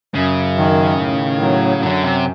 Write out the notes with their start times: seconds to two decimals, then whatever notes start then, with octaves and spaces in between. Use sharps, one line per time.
0.15 F#2 C#3
0.58 D#3
0.99 A2
1.41 F#3
1.82 F#2 D3
2.03 C3